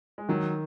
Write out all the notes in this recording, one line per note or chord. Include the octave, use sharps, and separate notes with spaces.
G#3
D#3 F#3